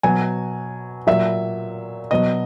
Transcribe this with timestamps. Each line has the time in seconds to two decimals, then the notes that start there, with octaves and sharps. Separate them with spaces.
0.03 B2 F#3 G#5
1.07 A#2 F#3 E5
2.11 B2 F#3 D#5